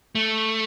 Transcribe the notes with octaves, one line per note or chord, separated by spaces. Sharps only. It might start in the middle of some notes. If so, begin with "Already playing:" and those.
A3